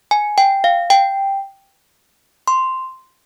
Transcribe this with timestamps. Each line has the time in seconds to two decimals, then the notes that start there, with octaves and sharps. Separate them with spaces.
0.11 G#5
0.38 G5
0.64 F5
0.90 G5
2.48 C6